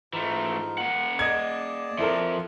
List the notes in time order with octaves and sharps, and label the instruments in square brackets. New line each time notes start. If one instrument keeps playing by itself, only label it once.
[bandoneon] G#2 D#4 F4 [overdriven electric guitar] E3 A3
[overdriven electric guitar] A#3 F#5
[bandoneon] G#4 D5 A5 [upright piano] D#5 G#6
[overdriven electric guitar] F3 C4 [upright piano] E4 A4 A#4